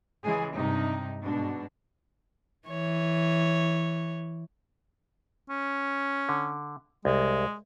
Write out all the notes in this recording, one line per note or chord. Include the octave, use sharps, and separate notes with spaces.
C#3 E3 G#3 G#4
G2 C3 D#4
G#2 B2 D4
E3 C#5
C#4
D3
C2 G#3